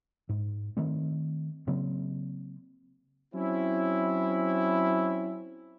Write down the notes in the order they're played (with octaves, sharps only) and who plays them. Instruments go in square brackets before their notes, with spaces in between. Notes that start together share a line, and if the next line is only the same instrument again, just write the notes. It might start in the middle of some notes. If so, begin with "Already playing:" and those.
[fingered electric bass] G#2
D#3 A3 C4
C#3 F#3 A#3 C4
[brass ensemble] F#3 C4 C#4 E4